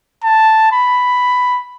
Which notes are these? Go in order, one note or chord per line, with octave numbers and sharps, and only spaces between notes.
A5
B5